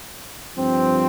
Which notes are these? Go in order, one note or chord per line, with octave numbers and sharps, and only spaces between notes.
G2 F3 C4